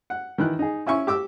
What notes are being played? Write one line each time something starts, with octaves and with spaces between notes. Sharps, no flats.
F#5
D#3 E3 F#6
D#4 G#4
C#4 E4 G#5 C#6
G4 D6 E6